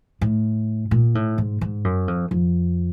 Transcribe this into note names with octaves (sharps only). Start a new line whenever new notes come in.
A2
A#2
A2
G#2
G#2
F#2
F2
F2